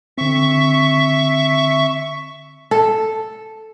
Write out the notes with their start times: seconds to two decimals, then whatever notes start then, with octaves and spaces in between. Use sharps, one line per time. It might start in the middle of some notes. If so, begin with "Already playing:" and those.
0.18 D3 C4 E5 C#6
2.71 A4